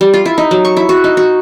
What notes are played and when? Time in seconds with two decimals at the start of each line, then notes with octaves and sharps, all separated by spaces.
0.01 G3
0.14 F4
0.26 E4
0.38 D#4
0.51 F#3
0.65 C#6
0.77 E4
0.89 F#4
1.04 D#4
1.17 F#4